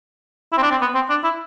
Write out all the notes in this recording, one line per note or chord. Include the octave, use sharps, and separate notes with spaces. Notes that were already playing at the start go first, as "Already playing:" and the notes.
E4
C4
D4
C4
B3
C4
D4
E4